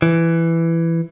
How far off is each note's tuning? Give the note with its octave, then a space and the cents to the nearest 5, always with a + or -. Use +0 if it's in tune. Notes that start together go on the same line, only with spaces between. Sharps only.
E3 +10